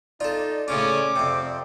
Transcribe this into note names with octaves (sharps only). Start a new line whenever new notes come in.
D#4 F4 A4 D5
A2 C#3 C#4 F4 D6
F2 C3 C4